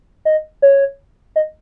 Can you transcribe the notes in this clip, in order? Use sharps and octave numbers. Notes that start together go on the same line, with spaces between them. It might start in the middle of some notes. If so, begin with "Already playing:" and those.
D#5
C#5
D#5